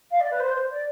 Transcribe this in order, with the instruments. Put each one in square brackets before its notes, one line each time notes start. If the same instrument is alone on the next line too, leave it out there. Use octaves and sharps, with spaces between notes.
[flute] F5
D5
B4
C5
C5
D5